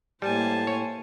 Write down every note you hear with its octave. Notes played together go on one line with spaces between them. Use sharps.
A2 G3 A#3 C5 G#5 A5
C#5